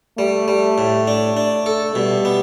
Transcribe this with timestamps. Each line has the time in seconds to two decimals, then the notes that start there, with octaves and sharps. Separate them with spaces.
0.18 G3 A3
0.48 G3
0.78 A2
1.07 D4
1.37 D4
1.66 A4
1.95 B2 G3
2.25 B3